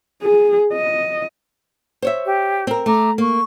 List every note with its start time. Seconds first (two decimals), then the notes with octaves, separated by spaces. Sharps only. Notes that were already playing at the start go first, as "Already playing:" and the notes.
0.23 G#4
0.73 D#5
2.02 C5 C#5 E5
2.26 G4
2.67 C4 A#4
2.86 A3 A#5 D6
3.18 A#3 C#6